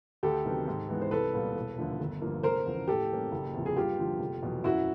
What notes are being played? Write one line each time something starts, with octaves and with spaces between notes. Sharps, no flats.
D2 G4 A4
C3 D#3 F#3 B3
G#2
E3 G#3 B3
C5
C2 A4 B4
A#2 G3 B3
E1
D#2 D3 F3 A3
G1
G2 D3 F3 A#3
F1 A#4 C5
E2 C#3 F3
A2 G4 A4
E3 G3 A#3 C#4
F#1
E2 C3 F3
G#4
G2 F4 G4
D3 F3
F1
E2 B2 F#3
F#2 E4 F#4